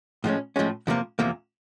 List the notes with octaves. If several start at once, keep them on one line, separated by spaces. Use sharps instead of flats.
A2 F3 G#3 C#4
A2 F3 G#3 C#4
E2 C3 F3 A#3
E2 C3 F3 A#3